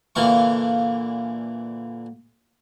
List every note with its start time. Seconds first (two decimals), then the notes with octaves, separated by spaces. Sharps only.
0.15 A#2 D3 E3 F5 C#6